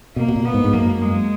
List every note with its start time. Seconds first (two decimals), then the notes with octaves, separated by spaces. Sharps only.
0.16 B2 A#3
0.28 B2
0.36 A#2
0.45 B3
0.54 G#2
0.64 G#2
0.73 F#2 A#3
1.02 G#3